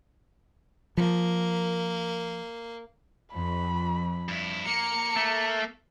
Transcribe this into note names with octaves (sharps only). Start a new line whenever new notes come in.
F3 A#3
F2 B5
G2 E4
A#3 A#5 C#7
A3